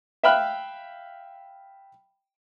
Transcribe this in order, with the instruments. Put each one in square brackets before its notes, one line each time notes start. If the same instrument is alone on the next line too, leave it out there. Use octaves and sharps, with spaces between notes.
[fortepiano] E5 F5 G5 B5 F6 F#6